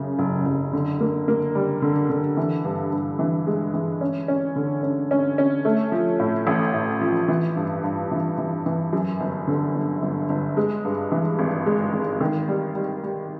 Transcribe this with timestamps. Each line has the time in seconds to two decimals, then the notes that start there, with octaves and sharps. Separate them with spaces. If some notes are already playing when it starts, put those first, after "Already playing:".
Already playing: F#2 C#3
0.19 F#1
0.46 F#1
0.73 D3
1.00 A#3
1.28 A#3
1.55 G3
1.82 D3
2.10 D3
2.37 E3
2.65 G2
2.92 G2
3.19 E3
3.47 G#3
3.74 E3
4.01 C#4
4.28 C#4
4.56 D3
4.83 C#4
5.11 C#4
5.38 C#4
5.65 A3
5.92 F3
6.20 A2
6.47 A1
6.74 A2
7.01 F3
7.28 E3
7.56 G2
7.84 G2
8.11 E3
8.38 E3
8.66 E3
8.93 F#2
9.20 G1
9.47 D3
9.75 G1
10.02 G1
10.29 G1
10.57 G#3
10.85 G2
11.12 E3
11.39 G#1
11.66 G#3
11.93 G#1
12.21 D#3
12.48 G3
12.75 G3
13.03 G3